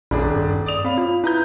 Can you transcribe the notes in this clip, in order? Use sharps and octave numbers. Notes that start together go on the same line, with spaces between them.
D#1 A#1 D4 G#4
G2
D5 D#6 F7
C4 C#5 F5 B5
F4
E4 B4 A#5 G6